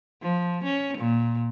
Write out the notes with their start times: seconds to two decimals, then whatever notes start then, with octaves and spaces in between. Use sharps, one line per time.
0.22 F3
0.64 C#4
0.98 A#2